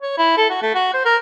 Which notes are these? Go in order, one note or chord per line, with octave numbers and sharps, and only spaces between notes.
C#5
E4
A4
F#4
A3
F#4
C5
A#4